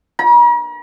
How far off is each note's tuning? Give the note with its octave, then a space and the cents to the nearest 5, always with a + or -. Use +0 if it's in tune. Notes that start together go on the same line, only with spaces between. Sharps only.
A#5 +45